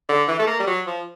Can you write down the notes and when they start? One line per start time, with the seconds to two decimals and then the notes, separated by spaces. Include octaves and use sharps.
0.09 D3
0.28 E3
0.39 A3
0.47 A#3
0.59 G3
0.67 F#3
0.87 F3